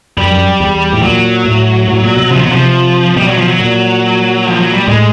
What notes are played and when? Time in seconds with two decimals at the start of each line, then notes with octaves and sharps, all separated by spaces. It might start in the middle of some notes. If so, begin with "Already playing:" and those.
0.17 F#2 G3
0.32 F#2
0.60 E2
0.93 A2
1.03 A#2 F#3
1.46 A2
1.88 A2
2.03 A#2
2.17 B2
2.31 C3 F3
2.42 B2 F#3
2.52 C3 F3
3.16 B2 G3
3.27 F#3
3.38 F3
3.48 F#3
3.60 A#2
4.47 F3
4.60 F#3
4.74 G3
4.88 A2 G#3